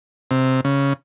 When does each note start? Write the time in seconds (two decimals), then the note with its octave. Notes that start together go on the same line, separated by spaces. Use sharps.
0.31 C3
0.65 C#3